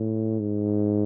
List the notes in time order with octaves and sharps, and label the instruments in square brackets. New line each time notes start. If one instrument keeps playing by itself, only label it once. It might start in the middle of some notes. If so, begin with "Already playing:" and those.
Already playing: [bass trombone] A2
G#2